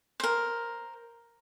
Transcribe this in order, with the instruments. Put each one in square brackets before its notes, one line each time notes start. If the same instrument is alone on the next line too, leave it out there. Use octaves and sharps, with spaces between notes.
[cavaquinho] A#4 C5